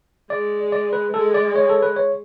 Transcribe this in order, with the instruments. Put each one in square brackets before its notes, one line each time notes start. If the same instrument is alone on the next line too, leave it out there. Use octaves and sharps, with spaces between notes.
[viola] G#3 [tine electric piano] D5
[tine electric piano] D5
B4
[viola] G#3 [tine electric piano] A4
[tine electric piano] D5
C#5
A4
B4
C#5